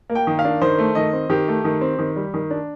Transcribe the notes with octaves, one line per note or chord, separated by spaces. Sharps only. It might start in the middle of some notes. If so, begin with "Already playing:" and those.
A#3
G5
D#3
F5
D4
D#3 C5
A3
D#3 D#5
C4
D#3 G4
A3
D#3
C4
D#3
G3
D#3
D4